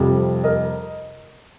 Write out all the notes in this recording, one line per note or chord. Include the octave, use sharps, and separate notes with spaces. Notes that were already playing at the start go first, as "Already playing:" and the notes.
Already playing: F2 C3 G3
A#4 D#5